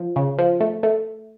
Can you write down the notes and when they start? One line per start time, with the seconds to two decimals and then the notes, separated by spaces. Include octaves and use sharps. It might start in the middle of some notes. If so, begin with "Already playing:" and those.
Already playing: F3
0.16 C#3
0.39 F3
0.61 A3
0.83 A3